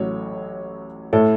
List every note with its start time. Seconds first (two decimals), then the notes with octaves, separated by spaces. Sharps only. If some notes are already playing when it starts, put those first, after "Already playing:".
Already playing: A1 A2 F#3 C#5
1.13 A2 A3 E4 A4